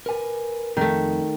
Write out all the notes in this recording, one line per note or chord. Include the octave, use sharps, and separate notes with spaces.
A#4 B4 G#5
F2 D#3 A3